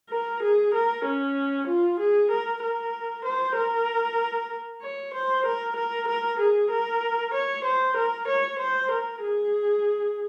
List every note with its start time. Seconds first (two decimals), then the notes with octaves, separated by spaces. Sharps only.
0.10 A#4
0.43 G#4
0.74 A#4
1.06 C#4
1.67 F4
1.99 G#4
2.31 A#4
2.63 A#4
3.25 C5
3.56 A#4
4.82 C#5
5.14 C5
5.46 A#4
5.76 A#4
6.08 A#4
6.40 G#4
6.71 A#4
7.34 C#5
7.65 C5
7.97 A#4
8.28 C#5
8.59 C5
8.91 A#4
9.23 G#4